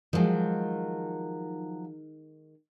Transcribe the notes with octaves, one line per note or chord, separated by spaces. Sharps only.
D#3 F3 F#3 G#3